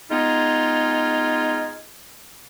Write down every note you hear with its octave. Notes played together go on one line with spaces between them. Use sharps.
G#3 B3 D#4 F4 G#4